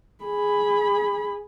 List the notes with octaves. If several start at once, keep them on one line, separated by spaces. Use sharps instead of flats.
G#4 B5